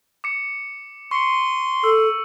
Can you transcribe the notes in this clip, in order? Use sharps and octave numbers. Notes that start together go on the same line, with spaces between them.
D6 C#7
C6 C#6 C#7
A4 E6